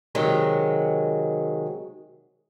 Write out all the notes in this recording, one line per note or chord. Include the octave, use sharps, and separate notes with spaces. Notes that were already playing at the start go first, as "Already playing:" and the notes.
C3 D#3 F#3 G#3